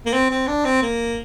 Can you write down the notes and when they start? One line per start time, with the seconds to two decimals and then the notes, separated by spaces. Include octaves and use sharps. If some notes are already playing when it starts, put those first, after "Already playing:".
0.06 A#3
0.13 C4
0.31 C4
0.47 D4
0.65 C4
0.82 A#3